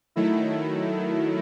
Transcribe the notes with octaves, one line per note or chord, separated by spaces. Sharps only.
D#3 F#3 A3 E4